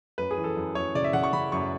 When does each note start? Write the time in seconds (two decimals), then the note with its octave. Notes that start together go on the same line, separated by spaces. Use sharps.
0.18 F#2 B4
0.31 G#4
0.38 E3
0.44 A4
0.56 F#2
0.75 F#2 C#5
0.95 C#3 D5
1.04 E5
1.13 C#3 F#5
1.24 C#6
1.33 C#3 B5
1.52 F#2 C#6